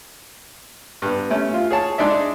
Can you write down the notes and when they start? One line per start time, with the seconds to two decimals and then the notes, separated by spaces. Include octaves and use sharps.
1.02 G2 B3
1.31 A3 C#4
1.54 F4
1.71 G#4 C#5 A5
1.98 G#3 D4 D#4 D5 E5